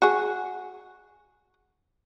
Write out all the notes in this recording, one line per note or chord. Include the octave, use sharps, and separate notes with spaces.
F#4 G#4